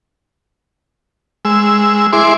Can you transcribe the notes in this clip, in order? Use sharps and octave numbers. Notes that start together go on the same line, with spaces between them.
G#3 E6
E4 G#4 C6 D6